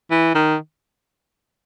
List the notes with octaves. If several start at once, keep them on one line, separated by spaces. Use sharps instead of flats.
E3
D#3